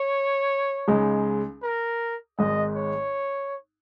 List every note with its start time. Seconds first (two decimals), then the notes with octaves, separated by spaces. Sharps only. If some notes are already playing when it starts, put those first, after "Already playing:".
Already playing: C#5
0.88 C#2 C#3 G#3 D#4
1.63 A#4
2.38 G#1 G#2 G#3 D#5
2.76 C#5